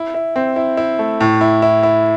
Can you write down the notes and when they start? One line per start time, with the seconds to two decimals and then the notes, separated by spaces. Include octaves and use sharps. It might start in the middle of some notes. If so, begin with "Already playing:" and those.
Already playing: E4
0.14 E4
0.36 C4
0.56 E4
0.77 E4
0.99 A3
1.21 A2
1.41 E4
1.62 E4
1.83 E4